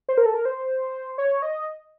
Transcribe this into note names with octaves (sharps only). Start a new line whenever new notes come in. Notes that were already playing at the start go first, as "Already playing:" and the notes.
C5
A#4
A4
A#4
C5
C#5
D#5